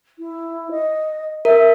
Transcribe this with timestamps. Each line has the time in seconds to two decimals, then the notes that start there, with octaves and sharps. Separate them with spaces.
0.19 E4
0.71 D#5
1.45 A#4 E5